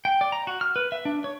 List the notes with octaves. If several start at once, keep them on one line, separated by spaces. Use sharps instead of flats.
G5
D5
A#5
F#4
F6
B4
E5
D4
C#5